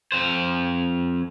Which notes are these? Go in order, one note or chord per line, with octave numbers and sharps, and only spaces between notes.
F2 C5